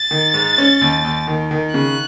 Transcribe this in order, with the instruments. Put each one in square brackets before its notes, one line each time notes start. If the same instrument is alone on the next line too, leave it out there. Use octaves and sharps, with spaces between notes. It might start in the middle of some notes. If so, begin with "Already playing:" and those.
Already playing: [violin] A6
[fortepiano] D#3
G#2
C#4
D#2
D#2
D#3
D#3
[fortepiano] C#3 [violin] F#6